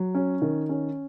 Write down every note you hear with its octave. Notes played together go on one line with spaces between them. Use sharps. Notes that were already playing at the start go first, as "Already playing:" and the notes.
Already playing: F#3
C#4
D#3
C#4